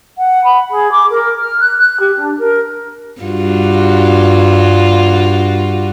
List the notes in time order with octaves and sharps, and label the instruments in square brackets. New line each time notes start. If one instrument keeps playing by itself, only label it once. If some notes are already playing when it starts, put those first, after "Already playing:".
[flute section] F#5
B5
G#4
D6
A#4
F6
F#6
F#6
G4
D4
A#4
[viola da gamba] G2 F4 F#4